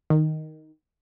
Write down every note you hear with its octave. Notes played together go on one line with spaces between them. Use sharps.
D#3